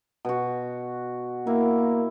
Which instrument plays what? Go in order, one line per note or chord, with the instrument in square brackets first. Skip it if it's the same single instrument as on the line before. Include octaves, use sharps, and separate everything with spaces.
[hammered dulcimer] B2 F#4
[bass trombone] A#3 [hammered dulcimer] E4